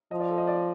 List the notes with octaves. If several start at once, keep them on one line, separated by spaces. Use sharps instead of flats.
F3 D#5
D5
A4
D#5
D5